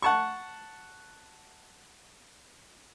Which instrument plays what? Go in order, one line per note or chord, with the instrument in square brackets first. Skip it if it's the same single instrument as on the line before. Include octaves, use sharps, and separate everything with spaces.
[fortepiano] F#5 A5 C#6